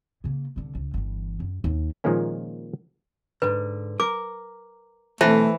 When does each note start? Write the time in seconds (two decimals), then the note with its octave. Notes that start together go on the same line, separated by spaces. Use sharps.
0.24 C#3 A#3
0.56 C2 D3
0.75 C#2
0.94 G1 E3
1.40 F#2
1.64 D#2
2.04 A#2 D#3 F3 G#3 A#3 C#4
3.42 G#2 D3 B4
4.00 A#4 D6
5.21 B1 E3 A3 C4 E4 A4 C5 E5